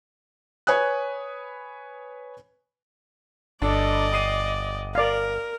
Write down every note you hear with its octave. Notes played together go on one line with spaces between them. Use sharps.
B4 C#5 G#5 D#6 F#6
G1 D4 A4 D5 D#5
D#6 C7 D#7
A#4 D5 F5